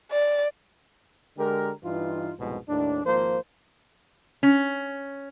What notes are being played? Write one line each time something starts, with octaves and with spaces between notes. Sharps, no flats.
D5
D3 G#3 G4 A#4
G2 E3 D#4 F4
C2 F2 G#2 B2 G#3
D#2 A2 D4
G#1 F3 A#3 C5
C#4